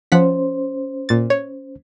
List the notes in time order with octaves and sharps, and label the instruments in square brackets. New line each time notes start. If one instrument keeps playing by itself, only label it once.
[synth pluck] F3 F#5 B6 [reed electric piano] C#4 C5
[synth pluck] A#2 A6
C#5